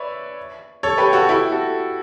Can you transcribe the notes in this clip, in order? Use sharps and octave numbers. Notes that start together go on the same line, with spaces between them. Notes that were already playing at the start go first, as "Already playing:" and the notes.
Already playing: B4 C#5 D5 E5
A4 C#5
G4 B4
F#4 A4
E4 G4
F#4 A4